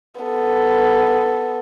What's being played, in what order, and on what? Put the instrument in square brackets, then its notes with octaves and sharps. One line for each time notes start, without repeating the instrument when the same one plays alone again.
[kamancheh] B3 A4